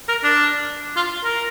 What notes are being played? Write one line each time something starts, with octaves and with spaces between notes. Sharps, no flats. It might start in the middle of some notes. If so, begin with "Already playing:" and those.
A#4
D4
F4
A#4